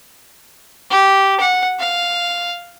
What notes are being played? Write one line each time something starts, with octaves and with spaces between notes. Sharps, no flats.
G4
F#5
F5